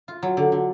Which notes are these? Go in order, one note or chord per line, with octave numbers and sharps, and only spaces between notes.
F4
F#3
D3
D3